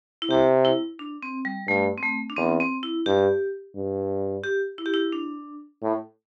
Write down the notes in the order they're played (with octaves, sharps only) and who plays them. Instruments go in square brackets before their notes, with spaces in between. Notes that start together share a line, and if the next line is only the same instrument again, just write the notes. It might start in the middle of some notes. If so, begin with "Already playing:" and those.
[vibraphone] E4
[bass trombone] C3 [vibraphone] G4
[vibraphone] E4
D4
C4
G3
[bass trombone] G2 [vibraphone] A3
[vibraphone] C4
A3
D4
[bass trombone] E2 [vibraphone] C4
[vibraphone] C4
E4
[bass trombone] G2 [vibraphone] G4
[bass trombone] G2
[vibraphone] G4
E4
G4
E4
D4
[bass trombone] A2